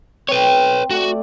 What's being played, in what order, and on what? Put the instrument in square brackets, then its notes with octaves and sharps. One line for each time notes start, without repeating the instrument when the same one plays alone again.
[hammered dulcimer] C4 [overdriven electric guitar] B4 C#5
[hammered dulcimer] A3 D5 [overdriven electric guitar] F#4